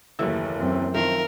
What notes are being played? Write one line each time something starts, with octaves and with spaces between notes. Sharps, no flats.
F#1 D#2 E3 A3 E6
F#2 C4
D#3 F3 A#4 E5 F5 C#6